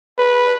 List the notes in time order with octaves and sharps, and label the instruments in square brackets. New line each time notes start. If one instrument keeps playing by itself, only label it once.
[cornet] B4